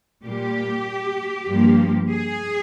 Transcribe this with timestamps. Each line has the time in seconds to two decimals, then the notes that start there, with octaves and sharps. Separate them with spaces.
0.25 A#2 G3 A#3 G4
1.48 G2 F3 A#3
2.10 G#4